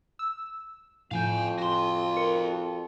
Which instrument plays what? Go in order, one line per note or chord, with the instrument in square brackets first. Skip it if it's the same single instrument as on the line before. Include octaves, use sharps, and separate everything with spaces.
[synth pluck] E6
[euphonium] F2 [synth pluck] A2 F3 G6 [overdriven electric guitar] F5 G#5
[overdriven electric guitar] F#4 C6
[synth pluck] A#4 C#7